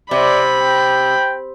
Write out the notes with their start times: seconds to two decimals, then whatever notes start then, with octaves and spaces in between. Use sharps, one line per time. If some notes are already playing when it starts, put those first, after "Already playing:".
0.11 C3 D5 B5
0.61 G5